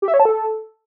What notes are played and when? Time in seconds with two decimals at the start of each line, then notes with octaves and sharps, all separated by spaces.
0.02 G4
0.08 E5
0.14 C#5
0.20 A5
0.25 A4